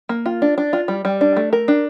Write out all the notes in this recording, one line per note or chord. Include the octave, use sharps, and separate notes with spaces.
A#3
F4
D4
D4
F4
G3
G3
D4
A3
A#4
D4